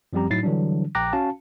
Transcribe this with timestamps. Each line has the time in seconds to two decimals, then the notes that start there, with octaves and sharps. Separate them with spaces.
0.13 F#2 F3 G3 C4 G4 A#5
0.30 A2 F#3 D#4 E4 A6 C7
0.43 D3 E3 F#3 G3 D4
0.95 A#1 G5 A#5 D6 F#6 A#6
1.13 C#4 F#4 F5 A5